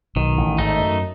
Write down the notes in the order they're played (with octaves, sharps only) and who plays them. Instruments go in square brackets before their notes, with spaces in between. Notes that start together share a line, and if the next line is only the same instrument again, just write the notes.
[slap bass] B1 B2 [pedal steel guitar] D#3
[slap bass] A1 A2
[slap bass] G#1 G#2 [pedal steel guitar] A3 D#4
[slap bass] F#2